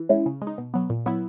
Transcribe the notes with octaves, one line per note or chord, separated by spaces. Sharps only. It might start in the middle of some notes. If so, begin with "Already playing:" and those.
Already playing: E3
G#3 C#4 E4
C#3
G#3
D#4
B2
F#3 B3
A#2
F#3 B3 E4